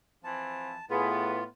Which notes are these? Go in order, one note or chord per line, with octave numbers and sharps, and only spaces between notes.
E3 F3 C4 A5
A2 B3 F4 G#4